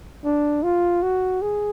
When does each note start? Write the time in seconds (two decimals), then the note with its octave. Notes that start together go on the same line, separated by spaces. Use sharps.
0.24 D4
0.63 F4
1.03 F#4
1.42 G#4